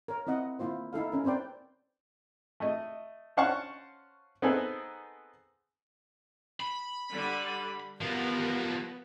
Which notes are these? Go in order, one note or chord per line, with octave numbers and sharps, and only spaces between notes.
A#4 C#5
C4 E4 D#5 F#5
A#3 E4 F4 C5
D#4 E4 A4 F5
C#4 A#4
C4 B4 C5 D5 G5
A3 D#5
C#4 C5 F5 F#5 A5 C#6
B3 C4 D#4 G#4 A4 B4
B5
D3 G3
F3 F#3 B3 G4 A#4